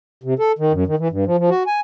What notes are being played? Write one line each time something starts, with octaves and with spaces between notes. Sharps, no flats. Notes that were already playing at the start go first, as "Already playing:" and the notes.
C3
A4
D#3
F#2
D#3
E3
G2
F3
F3
F#4
G#5